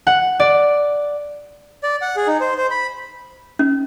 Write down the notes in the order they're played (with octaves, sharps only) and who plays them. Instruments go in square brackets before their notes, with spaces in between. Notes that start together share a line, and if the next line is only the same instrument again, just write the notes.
[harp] F#5
D5
[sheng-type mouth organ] D5
F#5
G#4
D#4
C5
C5
B5
[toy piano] C#4